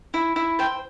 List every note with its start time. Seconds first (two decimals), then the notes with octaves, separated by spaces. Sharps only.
0.14 E4
0.36 E4
0.59 C5 G5